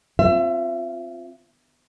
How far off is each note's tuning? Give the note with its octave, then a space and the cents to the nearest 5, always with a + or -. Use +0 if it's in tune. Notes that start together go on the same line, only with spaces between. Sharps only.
C4 +5 F4 +0 E5 +30